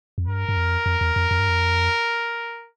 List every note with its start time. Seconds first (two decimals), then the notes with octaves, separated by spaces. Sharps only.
0.18 F2
0.27 G2 A#4
0.49 G2
0.56 F2
0.86 F2
1.01 E2
1.16 F2
1.31 F2
1.39 G2
1.49 F2